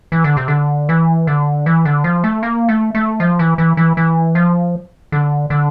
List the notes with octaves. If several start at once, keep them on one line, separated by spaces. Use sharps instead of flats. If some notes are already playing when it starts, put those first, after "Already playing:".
E3
D3
C3
D3
E3
D3
E3
D3
F3
A3
A#3
A3
A3
F3
E3
E3
E3
E3
F3
D3
D3